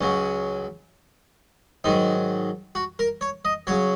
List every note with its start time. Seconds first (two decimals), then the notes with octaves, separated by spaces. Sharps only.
0.01 C#2 C#3 F#3 C#4
1.84 G#2 D#3 F#3 D#4
2.75 F#4
2.99 A#4
3.21 C#5
3.45 D#5
3.67 C#3 F#3 C#5